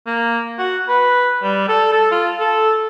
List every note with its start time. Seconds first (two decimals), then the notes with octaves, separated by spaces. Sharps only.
0.07 A#3
0.59 F#4
0.89 B4
1.43 G3
1.69 A4
1.93 A4
2.11 F4
2.40 A4